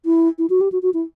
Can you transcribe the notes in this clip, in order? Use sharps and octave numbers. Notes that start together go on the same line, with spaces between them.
E4
E4
F#4
G4
F#4
F#4
E4